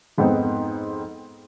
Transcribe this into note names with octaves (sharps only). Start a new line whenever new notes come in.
F2 G#2 B3 C4 D#4